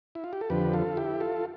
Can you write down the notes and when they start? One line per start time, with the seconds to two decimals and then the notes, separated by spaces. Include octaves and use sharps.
0.15 E4
0.24 F4
0.33 G4
0.41 A4
0.50 F2 D3 F3 G4 B4
0.73 F4 A4
0.97 E4 G4
1.20 F4 A4